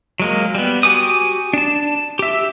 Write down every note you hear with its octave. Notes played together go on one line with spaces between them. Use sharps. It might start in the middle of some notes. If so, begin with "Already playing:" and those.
F#3 G#3 A#3
G3 B3
F#4 G4 G#5 D6 D#6
D4 A5
G4 E5